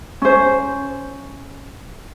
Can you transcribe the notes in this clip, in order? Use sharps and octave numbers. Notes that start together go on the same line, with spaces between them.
C#4 C5